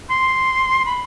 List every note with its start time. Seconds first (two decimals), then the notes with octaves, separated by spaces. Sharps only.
0.09 C6
0.85 B5